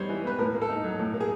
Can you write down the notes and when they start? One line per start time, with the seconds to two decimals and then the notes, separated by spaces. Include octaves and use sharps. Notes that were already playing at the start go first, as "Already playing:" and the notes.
Already playing: G3 B3 D#4 C5 C#5
0.09 E3
0.23 B3 B4
0.38 A2 A#4
0.54 A#3
0.62 A4
0.69 D#4
0.84 F#3
0.99 A2
1.14 A#3
1.20 G#4